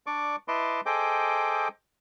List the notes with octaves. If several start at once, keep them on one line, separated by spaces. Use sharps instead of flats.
D4 D5 C#6 D6
E4 B4 D#5 A5 C6 D6
G#4 A4 C5 D#5 G5 D6